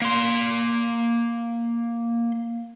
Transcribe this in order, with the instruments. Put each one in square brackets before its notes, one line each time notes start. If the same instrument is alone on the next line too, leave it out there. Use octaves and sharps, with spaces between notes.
[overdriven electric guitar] A#3 C6